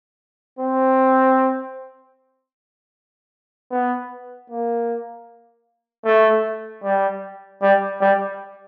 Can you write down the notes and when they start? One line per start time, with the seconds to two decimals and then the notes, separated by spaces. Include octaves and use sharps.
0.59 C4
3.71 B3
4.50 A#3
6.06 A3
6.84 G3
7.62 G3
8.01 G3